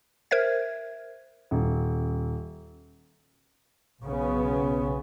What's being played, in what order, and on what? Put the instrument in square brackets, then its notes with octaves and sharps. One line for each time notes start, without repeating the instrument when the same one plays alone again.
[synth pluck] A#4 C5 E5 G#6
[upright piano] D#1
[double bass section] B1 C#3 B3 C#4